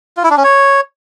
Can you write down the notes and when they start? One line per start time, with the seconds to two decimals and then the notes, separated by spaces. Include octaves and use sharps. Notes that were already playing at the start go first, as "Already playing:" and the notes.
0.17 F4
0.24 E4
0.31 D4
0.37 C#4
0.44 C#5